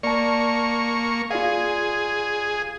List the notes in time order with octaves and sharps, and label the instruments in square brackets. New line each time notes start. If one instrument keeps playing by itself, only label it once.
[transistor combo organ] A#3 C#6 [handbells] D5 A5
[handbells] F4 D5 F5 [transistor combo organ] G#4